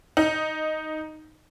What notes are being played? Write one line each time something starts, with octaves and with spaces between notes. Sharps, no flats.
D#4